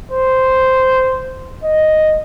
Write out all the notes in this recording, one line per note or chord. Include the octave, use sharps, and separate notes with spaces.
C5
D#5